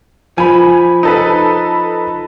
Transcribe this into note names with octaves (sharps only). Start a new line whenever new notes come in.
F3 G#5 B5
D#4 A4 B4